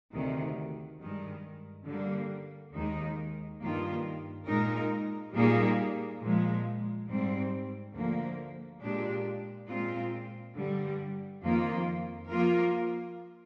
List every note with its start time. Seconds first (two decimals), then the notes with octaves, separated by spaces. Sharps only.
0.12 D2 C3 D#3
0.99 G2 D#3 G#3
1.86 D3 G3 A#3
2.74 D#2 D#3 G#3 D#4
3.60 G2 D#3 A#3 F4
4.46 A#2 G#3 D#4 A#4
5.34 A#2 G3 A#3 D#4 G#4
6.20 A#2 F3 G#3
7.08 G#2 G3 C4
7.94 D2 D3 F3 A#3
8.81 A#2 G#3 D4 G4
9.68 A#2 G#3 C4 F4
10.56 G2 D3 G3
11.42 F2 D#3 A#3 F4
12.29 F3 A#3 F4 A#4